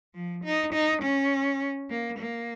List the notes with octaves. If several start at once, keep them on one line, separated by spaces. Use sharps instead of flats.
F3
D#4
D#4
C#4
A#3
A#3